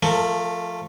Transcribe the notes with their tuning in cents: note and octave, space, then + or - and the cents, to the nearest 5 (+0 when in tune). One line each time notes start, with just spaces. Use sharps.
F3 +0 A3 +0 A#4 -30